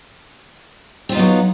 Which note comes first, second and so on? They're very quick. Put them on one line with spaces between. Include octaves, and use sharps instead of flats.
C4 F4 D#4 B3 F#3